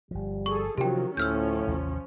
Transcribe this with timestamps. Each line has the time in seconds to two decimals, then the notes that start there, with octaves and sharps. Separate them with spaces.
0.11 G1 F3 G3
0.46 G#4 A4 C#6
0.78 C3 D#3 F3 F#3 C#4 G4 G5
1.17 D2 A2 F3 C#4 E6 F6 G6
1.67 A1 D#2 C3